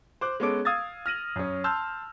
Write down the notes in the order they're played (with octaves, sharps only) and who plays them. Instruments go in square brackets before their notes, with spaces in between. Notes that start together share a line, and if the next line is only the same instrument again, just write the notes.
[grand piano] C5 D6 F#6
G#3 B3 C#4 A4 D6 D7
F5 D#6 E6 G#6 A6
F6 A#6 D#7 F#7
F#2 C#4
A5 C6 E6 F6 G6